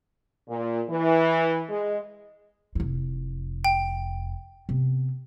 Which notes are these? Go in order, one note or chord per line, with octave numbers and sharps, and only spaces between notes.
A#2
E3
G#3
F1 E4
G5
C3 B3